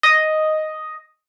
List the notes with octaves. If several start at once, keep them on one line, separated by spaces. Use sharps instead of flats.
D#5